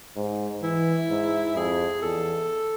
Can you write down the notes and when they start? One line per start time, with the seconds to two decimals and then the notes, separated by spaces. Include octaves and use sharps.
0.16 G#2
0.62 E3 E4
1.09 G#2
1.56 F2 G#4
2.02 E2 A4